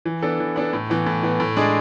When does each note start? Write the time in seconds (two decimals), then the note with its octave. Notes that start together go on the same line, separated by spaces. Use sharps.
0.05 E3
0.22 B3 D4 A4
0.40 E3
0.56 B3 D4 A4
0.73 A2
0.90 E3 B3
1.07 A2
1.23 E3 B3
1.40 A2
1.56 G#3 D4 G#4 D5